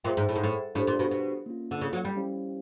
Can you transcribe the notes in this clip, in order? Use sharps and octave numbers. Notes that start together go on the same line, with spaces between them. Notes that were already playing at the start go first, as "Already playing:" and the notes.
A#2 G#4 C5 E5 G5
G#2
A2
G#2
A2
A2 D4 G4 C5
A#2
B2
B2
A#3 C#4 F4
D3
C#3
F#3
G3
C#4 E4 G4 C5 F5